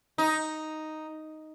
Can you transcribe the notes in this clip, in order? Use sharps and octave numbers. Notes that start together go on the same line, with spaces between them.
D#4